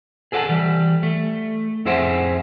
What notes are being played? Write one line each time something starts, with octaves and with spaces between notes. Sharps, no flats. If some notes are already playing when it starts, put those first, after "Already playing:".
G#4 A4 B4 F5 F#5 A5
E3 G3
A3
F2 E4 G#4 C5 E5 F#5